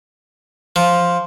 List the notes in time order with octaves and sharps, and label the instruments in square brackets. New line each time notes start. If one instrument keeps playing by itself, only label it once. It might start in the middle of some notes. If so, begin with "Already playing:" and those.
[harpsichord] F3